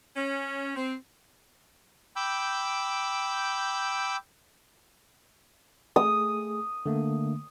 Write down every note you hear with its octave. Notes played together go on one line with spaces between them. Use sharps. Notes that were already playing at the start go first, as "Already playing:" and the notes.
C#4
C4
G5 B5 D6 E6 G6
A3 G#4 D#6
D3 A3 A#3